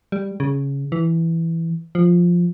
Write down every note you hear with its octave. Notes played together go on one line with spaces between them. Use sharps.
G3
C#3
E3
F3